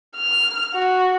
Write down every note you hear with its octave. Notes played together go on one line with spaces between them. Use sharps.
F6
F#4